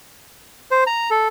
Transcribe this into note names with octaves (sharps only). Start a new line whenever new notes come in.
C5
A#5
A4